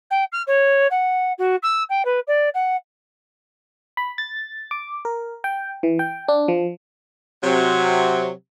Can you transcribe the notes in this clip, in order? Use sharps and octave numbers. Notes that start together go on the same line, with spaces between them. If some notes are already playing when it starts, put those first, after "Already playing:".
G5
F6
C#5
F#5
F#4
E6
G5
B4
D5
F#5
B5
A6
D6
A#4
G5
E3
G5
D4
F3
C3 F#3